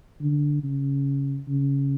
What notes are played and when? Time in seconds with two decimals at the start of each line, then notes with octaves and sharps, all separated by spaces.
0.21 D3
0.64 C#3
1.48 C#3